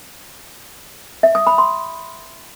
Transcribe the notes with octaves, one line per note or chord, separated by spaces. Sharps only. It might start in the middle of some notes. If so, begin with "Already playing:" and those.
E5
D#6
B5
C6